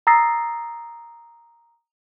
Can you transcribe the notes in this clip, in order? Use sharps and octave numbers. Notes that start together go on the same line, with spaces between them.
A#5 D#6 E6 A6 A#6 C7